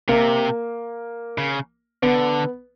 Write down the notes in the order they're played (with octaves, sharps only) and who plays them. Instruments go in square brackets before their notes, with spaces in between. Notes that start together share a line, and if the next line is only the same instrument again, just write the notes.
[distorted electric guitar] C3 [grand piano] A#3
[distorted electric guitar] C#3
[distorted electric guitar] D3 [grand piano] B3